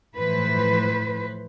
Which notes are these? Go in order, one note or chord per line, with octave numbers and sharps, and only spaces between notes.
A2 E3 F3 B4 C5